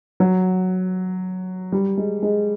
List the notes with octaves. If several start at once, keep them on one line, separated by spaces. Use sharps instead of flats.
F#3
G3
G#3
G#3